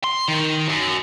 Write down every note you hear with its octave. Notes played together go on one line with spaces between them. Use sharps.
C6
D#3
F#2